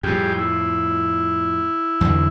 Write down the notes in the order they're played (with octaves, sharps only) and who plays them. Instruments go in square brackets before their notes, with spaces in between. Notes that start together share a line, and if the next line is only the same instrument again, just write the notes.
[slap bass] F2 A2 [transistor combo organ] G3 G4 G#4
[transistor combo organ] E4
[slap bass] E2 D3 F#3